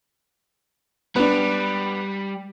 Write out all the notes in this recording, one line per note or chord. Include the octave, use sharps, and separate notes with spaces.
G3 B3 D4